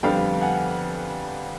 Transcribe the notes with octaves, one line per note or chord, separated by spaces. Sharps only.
F2 D3 G3 B3 F5 G5
F#5 G#5